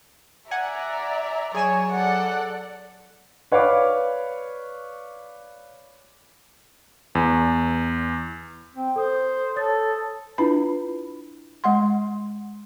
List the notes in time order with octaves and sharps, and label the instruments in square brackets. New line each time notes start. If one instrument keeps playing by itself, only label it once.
[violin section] D5 A#5 [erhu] E5 [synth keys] F#5 G#5
[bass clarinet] F#3 [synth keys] G#4 G#5 E7 [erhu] C#5
[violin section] A4 D5 [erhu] F#5
[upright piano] B4 C#5 D5 F5 B5 D6
[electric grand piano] E2
[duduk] C4
[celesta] A4 D#6 [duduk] C5
[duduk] A4 [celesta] C#5 D#6 A6
[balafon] D4 E4 F4 B4 B5
G#3 F#5 C6